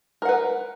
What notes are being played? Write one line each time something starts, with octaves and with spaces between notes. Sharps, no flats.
A#4 B4 F#5